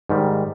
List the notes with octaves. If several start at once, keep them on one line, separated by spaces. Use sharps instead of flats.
G#2 D#3 G3